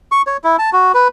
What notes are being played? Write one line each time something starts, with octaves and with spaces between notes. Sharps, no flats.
C#6
C#5
E4
A5
F#4
B4